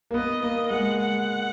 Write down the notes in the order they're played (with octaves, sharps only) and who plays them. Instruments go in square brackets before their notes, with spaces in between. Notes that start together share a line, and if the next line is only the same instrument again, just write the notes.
[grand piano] A#3
[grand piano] B3 [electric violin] D#5
[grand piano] A#3 [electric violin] D#5
[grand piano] G#3 [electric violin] F#5
[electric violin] F#5